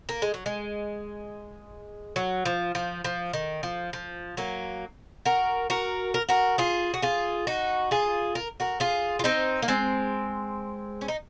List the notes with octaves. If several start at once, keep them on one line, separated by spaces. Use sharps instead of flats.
A#3
G#3
F#3
G#3
F#3
F3
F3
F3
D#3
F3
F3
F#3 A#3
F#4 A#4
F#4 A#4
A#4
F#4 A#4
F4 G#4
F#4
F4 G#4
D#4 F#4
F4 G#4
A#4
F#4 A#4
F4 G#4
F4
C4 D#4
A#3
G#3 C4
C#4
D#4